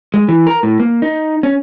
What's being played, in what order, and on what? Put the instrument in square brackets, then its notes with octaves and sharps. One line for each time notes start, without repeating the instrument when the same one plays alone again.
[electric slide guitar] G#3
E3
A#4
A2
A#3
D#4
C#4